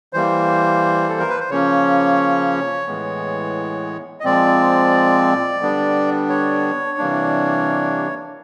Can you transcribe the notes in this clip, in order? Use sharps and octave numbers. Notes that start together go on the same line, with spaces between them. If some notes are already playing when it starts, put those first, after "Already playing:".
E3 G3 A#3 C5
A4
A#4
B4
C5
C#3 F3 A#3 C#4 C#5
A2 E3 G#3 B3
D#5
A#2 F3 G#3 C4 D5
D3 G3 B3 D4
C#5
C3 E3 G3 A#3 D4